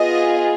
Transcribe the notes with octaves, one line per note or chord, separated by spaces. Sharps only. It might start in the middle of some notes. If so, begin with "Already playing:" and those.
Already playing: B3 F4 G#4 D#5